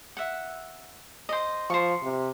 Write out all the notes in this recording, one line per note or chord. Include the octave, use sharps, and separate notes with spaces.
E5 F#5
C5 D#5
F3 C5 C#6
C3